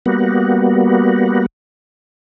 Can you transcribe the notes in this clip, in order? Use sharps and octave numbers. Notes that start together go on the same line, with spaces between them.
G3 A#3 B3 F#4